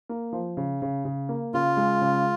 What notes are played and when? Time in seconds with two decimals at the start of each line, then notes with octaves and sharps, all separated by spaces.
0.09 A#3
0.33 F3
0.57 C#3
0.82 C#3
1.05 C#3
1.29 A#3
1.54 C#3 F4
1.77 G#3
2.01 C#3